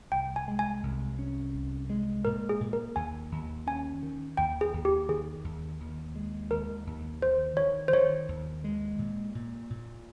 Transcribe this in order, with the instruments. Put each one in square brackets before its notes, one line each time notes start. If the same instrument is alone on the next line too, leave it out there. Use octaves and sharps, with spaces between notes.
[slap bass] C2 [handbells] G5
[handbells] G#5
[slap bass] G#3
[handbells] G#5
[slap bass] C2
C#4
C2
G#3
[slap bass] A#2 [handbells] A#4
[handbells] G#4
[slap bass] A#2
[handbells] A#4
[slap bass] D#2 [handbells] G#5
[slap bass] D#2
[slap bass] C#4 [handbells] G#5
[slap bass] D#3
[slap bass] D#2 [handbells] G5
[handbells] G#4
[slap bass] D#2
[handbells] G4
[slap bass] D#3 [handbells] G#4
[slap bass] D#2
D#2
G#3
[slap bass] D#2 [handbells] A#4
[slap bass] D#2
[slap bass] D#3 [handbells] C5
[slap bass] D#3 [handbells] C#5
[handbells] C5
[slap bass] D#3 [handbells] C#5
[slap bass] D#2
G#3
A#2
A#2
A#2